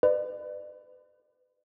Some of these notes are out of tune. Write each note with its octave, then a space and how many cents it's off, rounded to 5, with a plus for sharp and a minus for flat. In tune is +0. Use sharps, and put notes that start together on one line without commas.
B4 +35 D5 +35